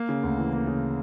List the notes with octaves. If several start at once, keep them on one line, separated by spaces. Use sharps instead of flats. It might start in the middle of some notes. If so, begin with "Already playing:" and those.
Already playing: A#3
C#3
D2
E3
A#3
C#3